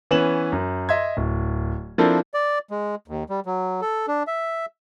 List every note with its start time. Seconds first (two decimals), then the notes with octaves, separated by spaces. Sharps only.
0.11 E3 B3 C#4 E7 F#7
0.52 F#2
0.89 D#5 E5 C6 G#6
1.17 D1
1.98 F3 C4 D4 E4 A4 A#4
2.34 D5
2.71 G#3
3.08 D#2
3.30 G3
3.46 F#3
3.81 A4
4.08 D4
4.27 E5